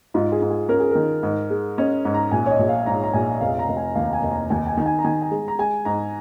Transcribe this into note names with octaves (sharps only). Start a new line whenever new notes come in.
G#2 F4
G#4
G#2
G#4
C#4 A#4
G#4
D#3 A#4
G#2
G#3
C#4 D#5
G#2
A#5
A#1 G#5
C#5
D#5
A#1
F5
G#2 A#5
A#5
A#1 G#5
F1 F5
A#5
F1
G#5
D#2 F5
G#5
F1
A#5
D#2 G#5
G#5
D#3
G#5
A#5
D#3 G#5
G#5
G#3
A#5
G#3 G#5
G#2 A#5